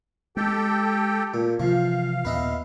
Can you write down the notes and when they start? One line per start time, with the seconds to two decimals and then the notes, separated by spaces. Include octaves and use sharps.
0.37 G#3 G4 A4 G5
1.34 A#2
1.60 C3 E3 F3 F5
2.25 D#2 A#2 B3 B4 D#5 E5